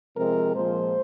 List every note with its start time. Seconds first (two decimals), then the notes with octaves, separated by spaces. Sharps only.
0.16 C3 F3 G#3 C4 A#4
0.54 A#2 F3 G#3 C5